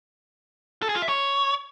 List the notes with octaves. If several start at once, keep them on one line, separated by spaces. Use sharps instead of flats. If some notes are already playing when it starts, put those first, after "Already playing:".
A4
G#4
F4
E5
C#5